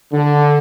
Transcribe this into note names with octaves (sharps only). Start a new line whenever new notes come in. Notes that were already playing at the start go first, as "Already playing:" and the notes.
D3